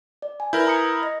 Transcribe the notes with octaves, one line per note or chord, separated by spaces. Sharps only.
D5
G#5
E4 A#4 B4 G6
A#5 D#6 C#7
D#5 A#6